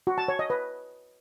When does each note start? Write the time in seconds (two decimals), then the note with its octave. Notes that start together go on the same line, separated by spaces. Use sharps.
0.07 F#4
0.18 A5
0.28 C#5
0.39 D#5
0.50 B4